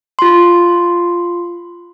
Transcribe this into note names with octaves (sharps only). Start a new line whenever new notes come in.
F4 C6